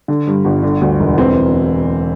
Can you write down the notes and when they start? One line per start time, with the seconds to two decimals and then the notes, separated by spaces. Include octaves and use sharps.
0.08 D3
0.27 G2
0.45 G1
0.63 D3
0.81 D2
1.00 E1
1.18 E3 C4